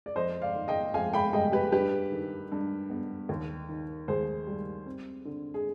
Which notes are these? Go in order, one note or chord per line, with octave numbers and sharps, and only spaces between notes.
D5
F2 C5 D#5
D5 F5
D#3
D#5 G5
F2 F5 G#5
G5 B5
G3 D#5 G5
G4 B4
G2 G4 B4
D#3
G2
B3
D#2
D#3
D#2 G#4 C5
G3
C4
D3
G#4